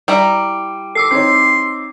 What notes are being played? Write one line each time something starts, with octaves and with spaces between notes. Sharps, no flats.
G3 E4 A#5 D6
A4 D6 E6 C7
C4 D#4 C#5 C6